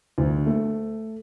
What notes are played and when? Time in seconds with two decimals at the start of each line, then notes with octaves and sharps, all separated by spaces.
0.18 D2
0.46 A3